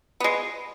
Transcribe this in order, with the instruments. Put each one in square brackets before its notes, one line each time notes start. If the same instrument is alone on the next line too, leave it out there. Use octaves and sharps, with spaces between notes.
[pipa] G#3 B3